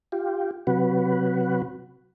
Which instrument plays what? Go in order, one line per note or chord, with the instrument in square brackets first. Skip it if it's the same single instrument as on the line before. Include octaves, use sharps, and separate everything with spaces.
[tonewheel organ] F4 G4
C3 F#3 F#4 B4